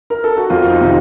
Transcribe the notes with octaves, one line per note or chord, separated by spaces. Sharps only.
A#4
A4
F#4
F2 F4
D#4
C3 D#3